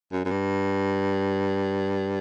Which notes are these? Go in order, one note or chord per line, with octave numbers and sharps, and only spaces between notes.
F#2
F#2
G2